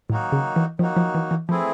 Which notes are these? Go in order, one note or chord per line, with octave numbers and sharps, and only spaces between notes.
A2 D#3 F#3 A#3 D#4 F#4
C#3
E3
D#3 F3 F#3 A#3 D#4 F#4
F3
E3
E3
E3 F3 A3 C4 E4 G#4